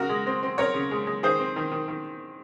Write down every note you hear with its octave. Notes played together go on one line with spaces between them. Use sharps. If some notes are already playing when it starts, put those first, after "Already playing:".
Already playing: C#3 F#4 A#4
G#3
C4
C4
C4 A#4 C#5
C#3
G#3
G#3
D#3 G#4 C5
C4
D#3
D#3
D#3